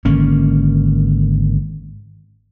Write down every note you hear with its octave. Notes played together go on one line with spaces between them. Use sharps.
G#1 D3 A#3 C#4